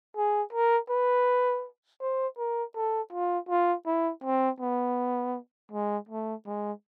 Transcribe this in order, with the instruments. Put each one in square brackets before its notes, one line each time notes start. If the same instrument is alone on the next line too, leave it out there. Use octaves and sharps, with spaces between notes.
[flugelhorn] G#4
A#4
B4
C5
A#4
A4
F4
F4
E4
C4
B3
G#3
A3
G#3